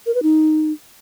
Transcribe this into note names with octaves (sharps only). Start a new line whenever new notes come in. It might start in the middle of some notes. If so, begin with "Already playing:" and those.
A#4
B4
D#4